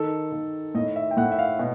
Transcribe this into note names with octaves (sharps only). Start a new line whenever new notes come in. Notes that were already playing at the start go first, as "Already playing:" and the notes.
Already playing: D#3 A4
D#3
A2 D#5
E5
G5
A2 F#5
E5
F5
B2